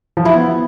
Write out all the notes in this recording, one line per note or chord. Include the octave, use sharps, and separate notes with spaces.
F3
E4
B3